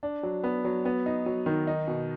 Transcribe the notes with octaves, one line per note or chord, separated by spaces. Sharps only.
D4
F#3
B3
F#3
B3
D#4
F#3
D#3
D#4
B2